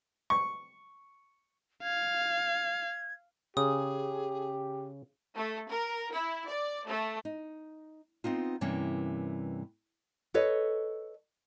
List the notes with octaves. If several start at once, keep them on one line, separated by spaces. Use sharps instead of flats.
C#6
F5 G#6
C#3 G4 G#4 D#6
A3
A#4
E4
D5
A3
D#4
B3 C4 D#4 F4
G2 C3 E3 G3 A#3 C#4
A4 B4 C#5 D#5